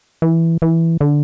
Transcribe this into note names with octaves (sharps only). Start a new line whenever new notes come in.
E3
E3
D3